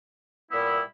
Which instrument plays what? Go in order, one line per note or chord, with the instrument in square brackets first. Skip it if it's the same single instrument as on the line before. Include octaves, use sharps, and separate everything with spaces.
[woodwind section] A#2 G3 B3 E4